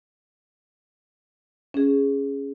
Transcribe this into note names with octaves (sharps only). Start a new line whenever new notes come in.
C#4 G#4